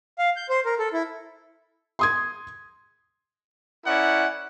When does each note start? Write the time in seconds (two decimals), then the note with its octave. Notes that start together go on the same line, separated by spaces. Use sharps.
0.18 F5
0.36 G6
0.49 C5
0.65 A#4
0.79 A4
0.93 E4
1.99 C6 D#6 G#6
3.86 C#4 E4 A#4 D5 F#5